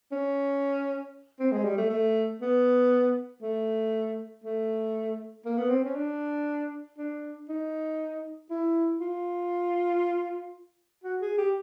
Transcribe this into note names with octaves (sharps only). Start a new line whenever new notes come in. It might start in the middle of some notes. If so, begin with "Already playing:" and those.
C#4
C4
G#3
G3
A3
A3
B3
A3
A3
A#3
B3
C4
C#4
D4
D4
D#4
E4
F4
F#4
G#4
G4